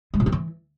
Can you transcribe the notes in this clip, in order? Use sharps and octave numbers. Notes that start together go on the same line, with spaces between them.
G#3
A#2
C4
E3